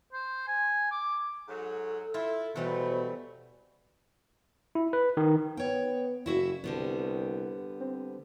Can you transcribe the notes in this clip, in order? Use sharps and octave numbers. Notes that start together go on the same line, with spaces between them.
C5
G#5
D6
G#2 F#3 A4
E4 F4
B2 E3 F#3 G3 A3 B3 C5
E4
B4
D#3
B3 C#5 G5
F#1 E4 F#4 E5
C2 D3 G3 B3
C4